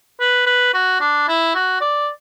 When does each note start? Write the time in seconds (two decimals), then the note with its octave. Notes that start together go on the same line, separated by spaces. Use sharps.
0.20 B4
0.46 B4
0.74 F#4
1.00 D4
1.28 E4
1.55 F#4
1.81 D5